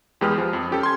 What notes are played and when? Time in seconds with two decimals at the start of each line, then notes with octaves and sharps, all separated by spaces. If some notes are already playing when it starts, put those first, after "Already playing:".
0.21 E2 G#3 G4 B4 D#6 F6
0.38 F3
0.53 F2
0.71 C#4 G4 A4
0.83 C6 G#6